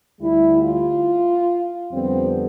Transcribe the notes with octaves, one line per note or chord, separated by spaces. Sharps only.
D2 D3 G3 E4
F4
F2 D3 G3 B3 C4